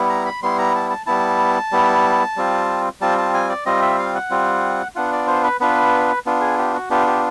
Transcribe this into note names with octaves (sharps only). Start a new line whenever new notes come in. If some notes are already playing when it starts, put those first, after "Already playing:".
Already playing: G3 B3 E4
A#5
B5
G3 B3 E4 C6
A#5
A5
A5
G3 B3 E4 A5
G3 B3 E4
G3 C4 F4
G3 C4 F4 A5
A5
G#5
D5
G3 C4 F4 D#5
E5
F5
F#5
G3 C4 F4
B3 D4 F4 F#5
D5
C5
B4
B3 D4 F4 B4
B3 D4 F4
G#4
G4
F#4
B3 D4 F4 G4
G4